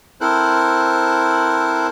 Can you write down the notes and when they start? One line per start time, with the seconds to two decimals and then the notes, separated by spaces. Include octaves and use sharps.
0.21 C4 E4 A4 A#4 C5 F#6